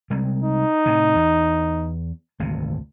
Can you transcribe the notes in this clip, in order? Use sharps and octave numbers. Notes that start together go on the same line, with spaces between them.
C3 G3 G#3
D#4
A2 C3
E2
G#1 D2 C3